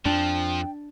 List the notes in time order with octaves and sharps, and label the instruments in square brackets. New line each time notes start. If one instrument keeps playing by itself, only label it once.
[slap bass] F2 [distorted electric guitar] F3 [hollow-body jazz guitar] D4 [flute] G5